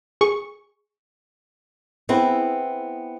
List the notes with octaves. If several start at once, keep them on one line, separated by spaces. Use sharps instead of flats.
G#4 C#6
B3 C4 E4 G#4